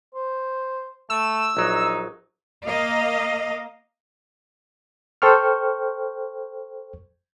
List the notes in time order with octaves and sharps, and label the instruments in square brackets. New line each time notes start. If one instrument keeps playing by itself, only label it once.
[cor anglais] C5
[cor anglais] A3 [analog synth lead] E6
[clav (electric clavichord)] A#1 F#3 [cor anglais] D#4
[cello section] A#3 D#5 F5
[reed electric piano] A4 C5 G5 C#6 F6